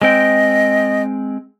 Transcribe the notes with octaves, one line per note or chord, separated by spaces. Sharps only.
G#3 C4 D#5 G5